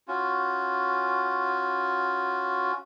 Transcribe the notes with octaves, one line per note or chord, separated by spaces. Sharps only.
C#4 F4 F#4